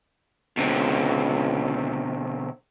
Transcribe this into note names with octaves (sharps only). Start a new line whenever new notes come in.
C#2 B2 D3 C4